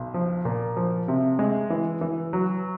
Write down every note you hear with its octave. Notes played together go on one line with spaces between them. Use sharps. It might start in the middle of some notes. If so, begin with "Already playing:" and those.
Already playing: B1
F3
A#2
F3
C3
G#3
E3
E3
F#3